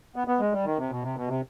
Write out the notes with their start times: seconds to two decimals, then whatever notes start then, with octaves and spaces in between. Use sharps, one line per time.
0.16 B3
0.28 B3
0.40 G#3
0.52 G3
0.65 D#3
0.78 C3
0.90 B2
1.03 C3
1.16 B2
1.28 C3